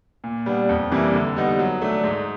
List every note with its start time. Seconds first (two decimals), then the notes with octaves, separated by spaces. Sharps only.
0.24 A#2
0.46 G3 B3 D4
0.69 F2
0.91 C3 E3 G3 A#3
1.14 D3
1.36 G3 B3 D#4
1.59 F#3
1.82 A3 D4
2.04 G#2